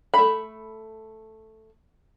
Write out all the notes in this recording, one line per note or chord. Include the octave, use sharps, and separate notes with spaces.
A3 B5